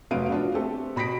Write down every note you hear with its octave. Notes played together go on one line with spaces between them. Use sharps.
F1 F#3 B3 F5 D7 D#7
F#3 B3 D4 F4
A3 C4 G4 A4
B2 B5 A#6 B6 D7